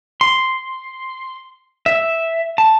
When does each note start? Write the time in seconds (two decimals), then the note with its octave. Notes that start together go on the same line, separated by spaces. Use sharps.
0.21 C6
1.86 E5
2.58 A5